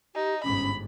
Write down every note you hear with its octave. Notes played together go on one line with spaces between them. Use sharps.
D#4 G4
G1 G#2 C#4 B5